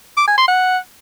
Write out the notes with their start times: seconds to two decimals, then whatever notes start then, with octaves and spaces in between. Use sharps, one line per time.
0.17 D6
0.27 G#5
0.38 C6
0.48 F#5